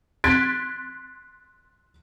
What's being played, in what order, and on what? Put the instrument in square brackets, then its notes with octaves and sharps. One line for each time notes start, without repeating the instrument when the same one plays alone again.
[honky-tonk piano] C6 F#6 G#6 A6 B6 D7